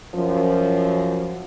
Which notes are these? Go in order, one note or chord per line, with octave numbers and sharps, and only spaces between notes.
F#2 F3